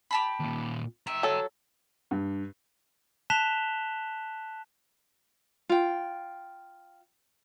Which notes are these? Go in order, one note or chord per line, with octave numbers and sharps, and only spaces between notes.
G4 A5 B5
D#2 A#2
E5 G5 A#5
F#3 A4
G2
A5 F#6 B6 E7 F7 G7
F4 G5